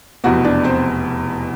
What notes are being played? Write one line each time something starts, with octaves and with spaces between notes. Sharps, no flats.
F1 E2 B2 F#4 F#5
D4 D5
C4 C5